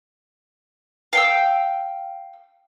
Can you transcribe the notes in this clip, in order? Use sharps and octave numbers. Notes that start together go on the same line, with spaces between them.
F5 G5 E6